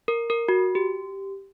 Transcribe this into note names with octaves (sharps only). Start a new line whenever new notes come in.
A#4
A#4
F#4
G4